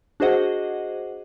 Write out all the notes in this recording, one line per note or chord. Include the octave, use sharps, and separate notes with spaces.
D4 F#4 G#4 C5 D#5 F#5